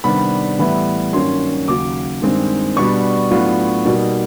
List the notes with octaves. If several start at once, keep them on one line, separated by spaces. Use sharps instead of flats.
C3 D#3 G3 B3 D4 B5
A2 E3 G3 B3 E4
G2 D#3 F#3 A#3 C#4 C6
D#2 C#3 F#3 D6
G2 D#3 G#3 C4
B2 G3 B3 D4 C#6
A2 F#3 B3 D4 F4
B2 G3 A#3 D#4